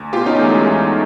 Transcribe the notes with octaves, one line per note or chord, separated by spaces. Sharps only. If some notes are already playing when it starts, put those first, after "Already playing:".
Already playing: D2
B2 F4 G4
C#4 D#4
E2 A3
G#3
E2